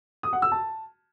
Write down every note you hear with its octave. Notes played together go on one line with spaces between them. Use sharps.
D#6
F#5
E6
A5